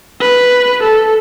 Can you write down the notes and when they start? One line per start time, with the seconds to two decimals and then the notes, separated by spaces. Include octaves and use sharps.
0.21 B4
0.83 A4